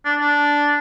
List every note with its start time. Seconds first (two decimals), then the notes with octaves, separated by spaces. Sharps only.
0.05 D4
0.20 D4